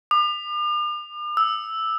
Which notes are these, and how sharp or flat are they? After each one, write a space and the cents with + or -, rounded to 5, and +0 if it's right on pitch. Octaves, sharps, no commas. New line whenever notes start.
D6 +45
E6 -5